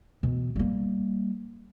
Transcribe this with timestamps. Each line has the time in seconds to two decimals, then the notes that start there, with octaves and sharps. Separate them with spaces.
0.23 B2 E3
0.56 G3 A#3